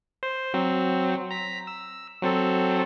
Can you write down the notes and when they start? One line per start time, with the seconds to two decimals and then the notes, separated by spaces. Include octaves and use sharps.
0.23 C5
0.54 F#3 C4
1.31 A#5 B6
1.67 E6
2.22 F#3 C4 A4